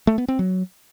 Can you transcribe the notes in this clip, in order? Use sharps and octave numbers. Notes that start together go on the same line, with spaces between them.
A3
B3
C4
F#3